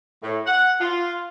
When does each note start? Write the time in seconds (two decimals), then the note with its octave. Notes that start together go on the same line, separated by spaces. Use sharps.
0.22 A2
0.46 F#5
0.80 F4